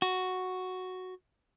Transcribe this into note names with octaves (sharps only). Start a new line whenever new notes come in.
F#4